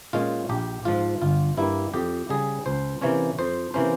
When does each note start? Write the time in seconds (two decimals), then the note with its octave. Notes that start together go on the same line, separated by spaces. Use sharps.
0.13 A#2 G#3 C#4 F4
0.49 A#1 G4
0.85 G#2 F3 F4
1.22 G1 F4
1.57 G2 G3 A#3 E4
1.94 F2 G4
2.29 C#3 G3 G#4
2.66 C#2 C5
3.01 C3 E3 A#3 C#4 C#5
3.39 F2 C5
3.74 C3 E3 A#3 C#4 C5